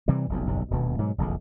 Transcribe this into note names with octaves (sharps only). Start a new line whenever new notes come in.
C3 E3 G3
F1 B1 F2
F#1 B1 E2 G2
D#1 D2 B2 B3
G#2 B2 F#3
F1 A#1 E2 D3